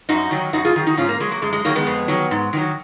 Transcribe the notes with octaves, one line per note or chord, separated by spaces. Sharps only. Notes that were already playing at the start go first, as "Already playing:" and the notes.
F#2 D#4 F#4
D#3 F#3
F#2 D#4 F#4
F4 G#4
D#3 F#3
D#4 F#4
G#2 C#4 F4
A#3
F#3 G#3
A#3
F#2 G#3
G#3
D#3 F#3 A#3
G#3 B3
F2
D#3 F#3
G#2
D#3 F#3